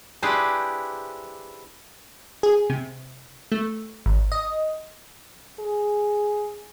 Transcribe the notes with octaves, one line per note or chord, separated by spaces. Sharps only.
D4 E4 G4 G#4 B4 C5
G#4
C3
A3
G#1
D#5
G#4